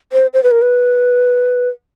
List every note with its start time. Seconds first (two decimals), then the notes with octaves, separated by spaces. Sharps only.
0.13 C5
0.33 C5
0.43 B4
0.51 A#4
0.62 B4